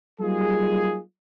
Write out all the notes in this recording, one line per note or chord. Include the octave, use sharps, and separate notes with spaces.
F#3 G3 A#3 D#4 F4 G#4